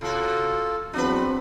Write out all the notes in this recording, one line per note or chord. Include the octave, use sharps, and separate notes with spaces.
C3 F4 F#4 A4
E2 F#3 C4 D4 B4